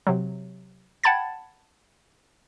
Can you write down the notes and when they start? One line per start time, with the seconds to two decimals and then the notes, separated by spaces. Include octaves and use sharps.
0.07 C3 F#3
1.04 F#5 G5 A5 B5 G#6 A6